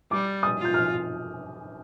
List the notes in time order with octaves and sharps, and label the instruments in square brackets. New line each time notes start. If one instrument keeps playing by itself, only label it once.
[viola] G3 [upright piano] D6
[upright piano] D#6
[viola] F4
[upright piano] G6
F6